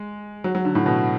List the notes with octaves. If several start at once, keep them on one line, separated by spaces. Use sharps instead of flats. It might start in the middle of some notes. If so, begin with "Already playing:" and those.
Already playing: G#3
F#3
F#3
D3
A2
B2